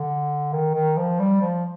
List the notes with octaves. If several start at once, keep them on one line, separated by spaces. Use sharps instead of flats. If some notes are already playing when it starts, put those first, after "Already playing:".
Already playing: D3
D#3
D#3
F3
G3
F3